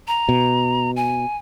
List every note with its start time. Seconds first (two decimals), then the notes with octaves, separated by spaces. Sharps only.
0.08 A#5
0.29 B2
0.96 G#5